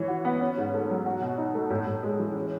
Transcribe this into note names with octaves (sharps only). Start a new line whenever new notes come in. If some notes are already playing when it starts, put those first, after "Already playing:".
Already playing: E3 C#5
F#4
B3
C#4
G#2
A3
F#3
F#4
B2
D#4
A3
A2
A2
G#3
E3
C#4